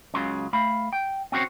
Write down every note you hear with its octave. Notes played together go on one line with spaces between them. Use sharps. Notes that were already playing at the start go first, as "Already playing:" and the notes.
C#2 C#3 F#3 C6
A3 F5 B5
G5
C4 C#4 F#4 C5 C#5